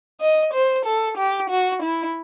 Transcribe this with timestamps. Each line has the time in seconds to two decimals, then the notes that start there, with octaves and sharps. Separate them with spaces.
0.20 D#5
0.53 C5
0.85 A4
1.17 G4
1.50 F#4
1.82 E4